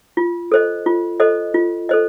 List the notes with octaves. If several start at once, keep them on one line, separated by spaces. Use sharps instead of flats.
F4
A4 C5 D#5
F4
A4 C5 D#5
F4
A4 C5 D#5